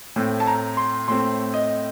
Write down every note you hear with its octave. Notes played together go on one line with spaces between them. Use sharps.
A2 A3 C4
A5
A#5
C6
A2 A3 C4 C6
D#5